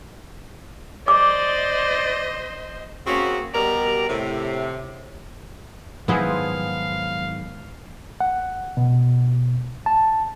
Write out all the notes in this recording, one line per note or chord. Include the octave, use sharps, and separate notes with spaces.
C5 D5 D#5 D6
C#3 A#3 C4 C#4 F#4
B2 G3 G4 A#4 D5 A#5
A2 C3
G#2 D#3 F3 F#3 B3 E4 G#4 F5
F#5
B2
A5